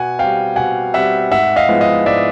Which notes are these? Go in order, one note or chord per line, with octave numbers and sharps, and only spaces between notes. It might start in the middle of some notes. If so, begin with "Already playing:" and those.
Already playing: B2 F#5 G#5
G3 C4 F5 G5
B2 F#5 G#5
G3 C4 E5 F#5
G#2 E5 F#5
D#5 F5
F3 G#3 B3 E4
D#5 F5
G#2 D5 E5